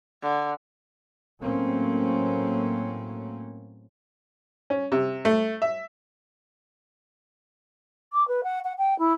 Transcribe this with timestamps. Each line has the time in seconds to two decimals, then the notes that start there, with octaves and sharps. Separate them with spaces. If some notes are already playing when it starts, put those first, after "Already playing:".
0.22 D3
1.42 A2 F#3 A3 A#3 C4 C#4
4.70 C#4
4.92 C3
5.25 A3
5.62 E5
8.12 D6
8.27 B4
8.43 F#5
8.64 F#5
8.78 G5
8.98 E4